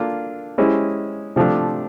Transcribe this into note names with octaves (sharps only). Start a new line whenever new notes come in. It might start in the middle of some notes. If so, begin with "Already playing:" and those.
Already playing: A#3 D4 F4 A4
G#3 C#4 E4 G4 C5
C3 F3 A3 D4